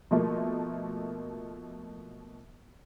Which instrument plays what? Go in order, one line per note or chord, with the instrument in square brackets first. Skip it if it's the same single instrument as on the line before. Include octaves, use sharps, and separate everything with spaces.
[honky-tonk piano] B2 F3 A3 A#3